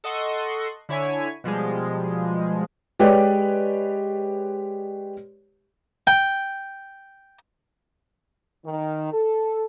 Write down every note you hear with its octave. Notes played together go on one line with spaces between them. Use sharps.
A4 D#5 F#5 C6 C#6
D3 E4 C#5 G#5 B6
B2 F3 G3 G#3
G#3 G4 B4 C#5 D5
G5
D#3
A4